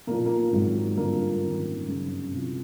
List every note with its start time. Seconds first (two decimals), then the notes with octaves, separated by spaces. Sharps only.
0.07 B1 A#2 F3 A#3
0.26 A#3
0.52 G#1 G#2 D#3 F#3
0.97 G#1 G2 D3 F3 A#3
1.41 G#1 F#2 D#3
1.87 G1 F#2 C#3 F#3
2.31 C2 C3 F3